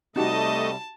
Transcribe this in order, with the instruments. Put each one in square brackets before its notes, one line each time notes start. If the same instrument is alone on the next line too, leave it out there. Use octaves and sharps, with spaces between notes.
[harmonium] C3 G3 [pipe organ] A3 D#5 [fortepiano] D#4 F#4 G4 [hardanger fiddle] A5